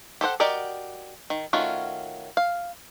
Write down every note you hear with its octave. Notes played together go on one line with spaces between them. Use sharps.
G4 A4 C5 F#5
F#4 G4 A#4 D5 D#5
D#3
D#3 A3 C#4 F4 F#4
F5